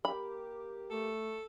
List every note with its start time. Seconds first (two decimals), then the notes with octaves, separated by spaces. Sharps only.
0.05 A#3 G4 B5
0.90 A3 A4